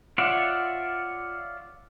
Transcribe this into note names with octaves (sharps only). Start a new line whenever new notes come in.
F4 C#5 D5 E5 F#5